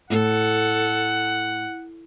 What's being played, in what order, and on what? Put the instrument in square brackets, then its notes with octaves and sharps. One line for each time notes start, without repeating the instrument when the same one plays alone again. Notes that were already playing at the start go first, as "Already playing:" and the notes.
[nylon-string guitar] A2 [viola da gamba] A4 [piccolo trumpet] F#5